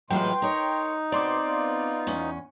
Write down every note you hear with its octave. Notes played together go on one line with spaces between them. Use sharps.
A2 E3 F#3 G#3 F4 B4 G5 C6
D#4 A#4 C#5
B2 B3 C4 D5 C6 D6
B3 F4
E2 C#4